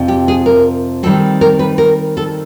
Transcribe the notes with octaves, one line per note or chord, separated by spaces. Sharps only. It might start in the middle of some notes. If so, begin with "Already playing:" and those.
Already playing: F2 C3 F3 G#3
G4
G#4
A#4
D#3 G3 C4 A4
A#4
B4
A#4
A4